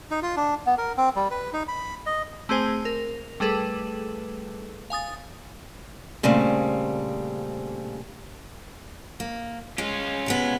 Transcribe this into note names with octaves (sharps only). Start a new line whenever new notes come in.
D#4
F4
D4
B3
A#4
C4
G3
B4
D#4
B5
D#5
A3 C4 G#4 C5 G#5
A#4
G3 A3 G#4 A4 B4
F5 G#5 D#6 A6
A#2 C#3 G3 A3 C4
A#3
G#3 C#4 F4
C3 G#3 B3